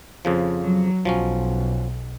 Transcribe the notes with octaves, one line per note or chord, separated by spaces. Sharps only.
F2 C#3 F3
F#3
B1 F3 F#3 C#4